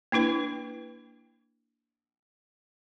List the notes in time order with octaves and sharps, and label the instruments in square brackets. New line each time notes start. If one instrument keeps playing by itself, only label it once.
[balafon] A#3 D4 E4 B4